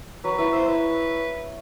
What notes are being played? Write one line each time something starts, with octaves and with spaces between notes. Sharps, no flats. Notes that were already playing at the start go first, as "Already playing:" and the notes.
F#3 B4
E4 B4
C5 E5
B4 E5